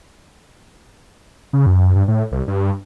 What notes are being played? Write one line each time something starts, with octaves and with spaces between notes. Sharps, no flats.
C#3
F#2
G2
A2
C2
G2